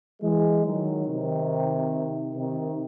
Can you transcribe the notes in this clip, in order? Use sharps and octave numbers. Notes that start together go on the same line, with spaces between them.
E3 G#3
D#3 F#3
C3 D#3
C3 D#3